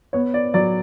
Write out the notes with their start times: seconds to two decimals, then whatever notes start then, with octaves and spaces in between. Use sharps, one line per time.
0.13 B3 C#5
0.34 D5
0.54 F#3 D5